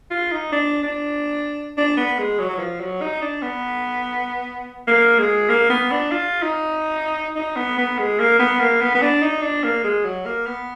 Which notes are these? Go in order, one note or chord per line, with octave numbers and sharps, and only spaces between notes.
F4
D#4
D4
D4
D4
B3
G#3
F#3
F#3
F3
F#3
D#4
D4
B3
A#3
G#3
A#3
B3
D4
F4
D#4
D#4
B3
B3
G#3
A#3
B3
A#3
B3
B3
D4
D#4
D4
A#3
G#3
F#3
A#3
B3